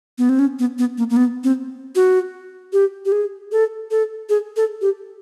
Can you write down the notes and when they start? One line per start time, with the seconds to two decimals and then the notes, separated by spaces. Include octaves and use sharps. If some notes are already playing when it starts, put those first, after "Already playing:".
0.18 B3
0.29 C4
0.39 C#4
0.59 B3
0.79 B3
0.98 A#3
1.10 A#3
1.17 B3
1.44 C4
1.95 F#4
2.73 G4
3.05 G4
3.12 G#4
3.52 A4
3.91 A4
4.29 G#4
4.56 A4
4.81 G4